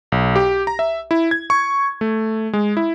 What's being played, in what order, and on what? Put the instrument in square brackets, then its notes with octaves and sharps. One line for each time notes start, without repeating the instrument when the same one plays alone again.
[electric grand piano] B1
G4
A#5
E5
E4
G#6
C#6
A3
G#3
E4